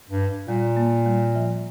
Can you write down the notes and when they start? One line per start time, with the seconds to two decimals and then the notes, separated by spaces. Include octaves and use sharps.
0.09 G2
0.47 A#2 G3
0.77 A#3
1.06 G3
1.35 F3